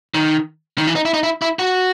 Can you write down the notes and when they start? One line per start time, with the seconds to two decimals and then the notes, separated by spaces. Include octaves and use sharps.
0.14 D#3
0.78 D#3
0.87 E3
0.96 D#4
1.05 E4
1.14 D#4
1.23 E4
1.42 E4
1.59 F#4